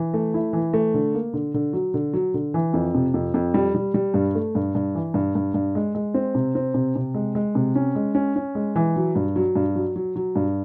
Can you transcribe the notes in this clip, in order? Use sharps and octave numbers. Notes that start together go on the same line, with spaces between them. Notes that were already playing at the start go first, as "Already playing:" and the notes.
Already playing: E3
A3
E4
E3
A3
D3
A#3
D3
D3
F#3
D3
F#3
D3
E3
F2
C3
F2
F2
G3
G3
G3
G2
A3
G2
G2
E3
G2
G2
G2
G#3
G#3
C4
C3
C4
C3
C3
G#3
G#3
C3
C#4
G#3
C#4
C#4
G#3
E3
F#3
G2
F#3
G2
F#3
F#3
F#3
G2